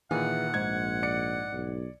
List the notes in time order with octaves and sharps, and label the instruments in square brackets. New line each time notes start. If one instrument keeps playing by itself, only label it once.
[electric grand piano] A#2 D#3 [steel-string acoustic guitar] E3 G#4 [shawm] F#5
[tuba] A#1 [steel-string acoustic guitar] G#2 [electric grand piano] G#6
[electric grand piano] D5 C#7
[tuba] B1